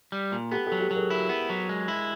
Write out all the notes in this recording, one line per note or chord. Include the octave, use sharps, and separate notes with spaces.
G3
A#2
B3 G4 A4
G4 A4
F#3
G4 A4
F#3
G#4 A#4
E4
B3
F#3
G#3
E4